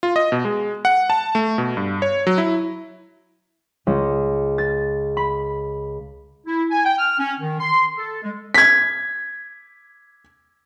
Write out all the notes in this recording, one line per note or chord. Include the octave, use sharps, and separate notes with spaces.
F4
D#5
B2
G#3
F#5
A5
A3
B2
G2
C#5
F#3
E4
C#2
A6
B5
E4
G#5
G5
F6
C#4
D#3
C6
A4
G#3
G#6 B6